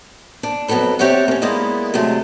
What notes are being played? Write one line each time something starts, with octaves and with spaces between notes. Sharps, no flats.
D4
F2 F#3 B3 C4 A4 B4
C4 G4 C#5 D5 E5 F#5
A#3 C#4
G#3 A#3 B3 E4 D5 D#5
C3 F#3 G#3 A3